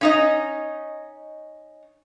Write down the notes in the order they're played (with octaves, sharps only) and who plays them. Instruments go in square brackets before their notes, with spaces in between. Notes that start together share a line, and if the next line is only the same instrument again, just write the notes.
[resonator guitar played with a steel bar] C#4 D#4 D#5